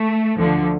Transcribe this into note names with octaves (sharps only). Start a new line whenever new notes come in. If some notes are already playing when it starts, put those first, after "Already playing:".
Already playing: A3
D2 D3 F3